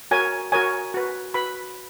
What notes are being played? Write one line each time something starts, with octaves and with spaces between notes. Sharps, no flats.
F#4 A#4 C#5 G#5
F#4 A#4 C#5 G#5
F#4 B4
F#4 B4 B5